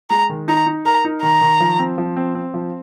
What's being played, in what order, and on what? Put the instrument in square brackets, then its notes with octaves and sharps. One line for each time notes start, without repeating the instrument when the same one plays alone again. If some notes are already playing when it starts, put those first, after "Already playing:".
[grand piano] G#3 [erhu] A#5
[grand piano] D#3
[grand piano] D#4 [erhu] A#5
[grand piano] D#4
[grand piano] A#4 [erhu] A#5
[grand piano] D#4
[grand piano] D#3 [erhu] A#5
[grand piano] D#3
F3
C4
F3
C4
C4
F3